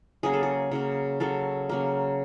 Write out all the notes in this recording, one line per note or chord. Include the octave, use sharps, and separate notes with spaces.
C#3 F#3 A#3 G#4
A4
G#4
C#3 F#3 A#3
C#3 F#3 A#3 A4
C#3 F#3 A#3